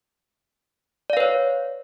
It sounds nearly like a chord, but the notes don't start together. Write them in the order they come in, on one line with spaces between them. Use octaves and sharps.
D5 F5 B4 C#5